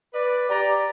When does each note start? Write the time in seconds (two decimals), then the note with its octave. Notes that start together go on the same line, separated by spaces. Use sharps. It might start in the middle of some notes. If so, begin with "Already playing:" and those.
0.14 B4 D5
0.50 G4 D5 A#5